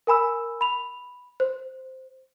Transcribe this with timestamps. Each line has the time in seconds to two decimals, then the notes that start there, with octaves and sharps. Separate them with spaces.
0.07 A#4 G#5 B5 E6
0.61 B5 F7
1.40 C5